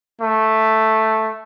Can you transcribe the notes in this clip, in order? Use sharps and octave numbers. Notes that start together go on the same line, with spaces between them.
A3